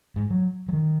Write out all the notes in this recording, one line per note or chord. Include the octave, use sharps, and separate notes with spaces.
G#2
F#3
F#3
D#3